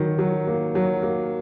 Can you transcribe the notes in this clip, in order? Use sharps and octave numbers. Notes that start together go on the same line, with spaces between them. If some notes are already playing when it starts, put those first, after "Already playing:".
Already playing: D#3 F#3
F#3
A#3
F#3
A#3